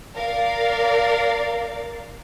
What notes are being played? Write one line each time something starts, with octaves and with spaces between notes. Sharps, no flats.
A#4 D5 F5